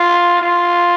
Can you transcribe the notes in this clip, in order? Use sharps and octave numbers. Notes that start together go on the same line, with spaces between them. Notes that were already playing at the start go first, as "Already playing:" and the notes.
Already playing: F4
F4